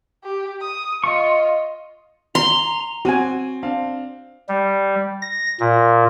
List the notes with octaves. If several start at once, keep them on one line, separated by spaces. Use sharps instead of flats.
G4
D#6
F4 D#5 C#6
A#5 C6
C4 F#4 G#5 D#7
C4 D4 F5
G3
A#6
A#2